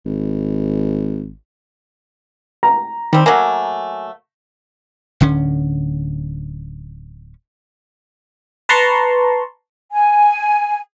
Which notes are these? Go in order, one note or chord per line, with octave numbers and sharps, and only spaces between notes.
G#1
A#5
D#3 G3 C4
F#3 A3 A#3 G#5
D1 D3 C#4
B4 A5 A#5 C6 C#6
G#5